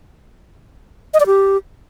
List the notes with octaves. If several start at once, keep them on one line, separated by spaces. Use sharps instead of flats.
D#5
D5
G4